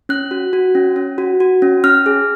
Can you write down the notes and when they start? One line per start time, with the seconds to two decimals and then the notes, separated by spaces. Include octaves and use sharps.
0.09 C#4 F#6
0.31 F#4
0.53 F#4
0.75 C#4
0.96 C#4
1.18 F#4
1.40 F#4
1.62 C#4
1.84 C#4 F6
2.06 G#4